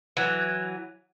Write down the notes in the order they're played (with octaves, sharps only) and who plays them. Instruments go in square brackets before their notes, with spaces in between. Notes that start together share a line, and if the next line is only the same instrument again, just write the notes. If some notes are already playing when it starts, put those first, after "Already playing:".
[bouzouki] E3 F#3